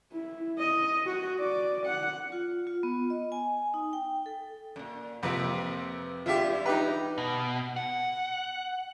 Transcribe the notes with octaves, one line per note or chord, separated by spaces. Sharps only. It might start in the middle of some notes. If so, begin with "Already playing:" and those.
E4
D#5
F#4
D5
F#5
F4
F4
B3
D#5
G#5
D#4
G5
A4
F#2 A#2
F2 C3 A#3 B4
E2 G2 F4 G4 E5
D#4 G4 B4
B2
F#5